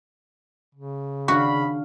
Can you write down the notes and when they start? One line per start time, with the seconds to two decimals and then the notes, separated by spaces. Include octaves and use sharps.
0.75 C#3
1.28 D#3 D4 F#4 F5 B5